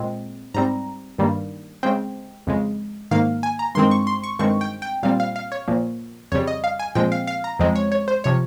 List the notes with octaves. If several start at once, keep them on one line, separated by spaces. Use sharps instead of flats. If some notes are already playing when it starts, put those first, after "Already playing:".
Already playing: A#2 G#3 C4
G#2 G3 C4 A#5
G2 D#3 G3 A#3
C#3 G#3 C4 G5
F2 C#3 G#3
G#2 D#3 A#3 F5
G#5
A#5
G2 D#3 G#3 C4 C6
C#6
C6
C#6
G2 D#3 G#3 C4 C#6
G5
G5
A#2 G3 C4 F5
F5
F5
C#5
A#2 F3 A#3
F2 C#3 G3 C#5
D#5
F5
G#5
A#2 F3 G#3 C4 G5
F5
F5
A#5
F2 C#3 F3 G#3 C4
C#5
C#5
C5
C3 F3 C#5